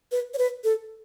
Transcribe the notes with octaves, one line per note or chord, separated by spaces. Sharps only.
B4
C#5
B4
A4